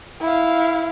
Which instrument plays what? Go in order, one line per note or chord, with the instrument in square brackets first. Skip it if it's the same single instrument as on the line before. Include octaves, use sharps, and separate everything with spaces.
[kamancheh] E4 F5